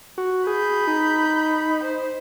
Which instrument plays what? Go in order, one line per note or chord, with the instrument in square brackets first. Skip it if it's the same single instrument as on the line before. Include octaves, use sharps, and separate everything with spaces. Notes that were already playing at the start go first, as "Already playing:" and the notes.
[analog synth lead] F#4
[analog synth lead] G#4 [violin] B5 G6
[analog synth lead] D#4
[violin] C5